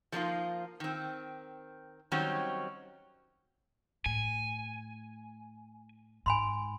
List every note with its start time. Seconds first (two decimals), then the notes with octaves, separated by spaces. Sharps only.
0.12 F3 A3 A#3 C#4 D#4 F4
0.80 D#3 C4
2.12 D#3 F#3 G3 C4 C#4
4.06 A2 G#5
6.26 G#2 G#5 B5 C6